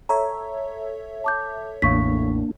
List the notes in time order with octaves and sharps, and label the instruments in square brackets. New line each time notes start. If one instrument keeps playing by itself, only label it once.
[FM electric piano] A4 C#5 E5 [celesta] A#5
[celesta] A5 D6 G6
[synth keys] A1 E2 A2 [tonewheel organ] A#3 D4 [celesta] F5 C#6 B6